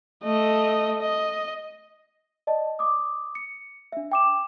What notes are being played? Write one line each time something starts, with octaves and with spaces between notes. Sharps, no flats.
A3 D#5
D#5
D5 D#5 A5
D6 D#6
C#7
D4 E5
G5 D6 E7